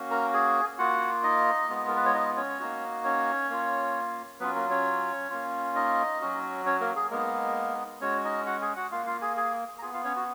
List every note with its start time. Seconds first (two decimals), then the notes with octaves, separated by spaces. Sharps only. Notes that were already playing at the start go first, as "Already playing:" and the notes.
Already playing: A#3 C#4 F#4
0.11 A#4 A#5
0.33 G#4 G#5
0.79 A#3 F4 F#4 F#5
1.24 D#4 D#5
1.69 G#3 B3 F4
1.88 A#4
1.96 B4
2.05 C#5
2.14 D#4 D#5
2.37 C#4 C#5
2.60 A#3 D#4 F#4
3.05 C#4 C#5
3.50 A#3 F4
4.40 F#3 B3 C#4 F4 B4
4.55 A#3 A#4
4.70 C#4 C#5
5.30 A#3 C#4 F4
5.76 D#4 D#5
6.21 F#3 C#4 F#4
6.66 C#4 C#5
6.81 A#3 A#4
6.96 G#4
7.11 G#3 A#3 B3 D#4 A#4
8.01 G#3 C#4 F#4 C#5
8.24 D#4 D#5
8.46 F#4 F#5
8.62 G#4 G#5
8.76 F#4 F#5
8.92 A#3 F4 F5
9.06 F4 F5
9.22 G#4 G#5
9.37 G#4 G#5
9.79 A#5
9.82 B3 F4 G#4 G#5
9.93 F4 F5
10.04 C#4 C#5
10.16 F#4